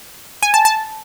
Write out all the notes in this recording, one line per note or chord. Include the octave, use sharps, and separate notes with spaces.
G#5
A5
A5